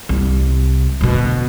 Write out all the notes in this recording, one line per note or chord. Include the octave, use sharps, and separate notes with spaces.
C2
D2 B2